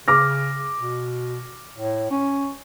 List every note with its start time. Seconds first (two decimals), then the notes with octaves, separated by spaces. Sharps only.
0.08 C#3 D6 F6 A#6
0.78 B2
1.76 A2
2.10 C#4